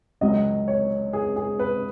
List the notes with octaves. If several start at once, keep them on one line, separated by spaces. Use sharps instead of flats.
C#2 C#3 F#3 C#4 D#5
C#5
G#4
G#4
B4